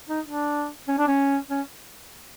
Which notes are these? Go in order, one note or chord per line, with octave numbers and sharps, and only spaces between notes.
D#4
D4
C#4
D4
C#4
C#4